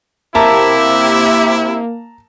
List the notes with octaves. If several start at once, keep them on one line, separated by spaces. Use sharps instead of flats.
C3 A#3 E4 G4 E5 A5 A#5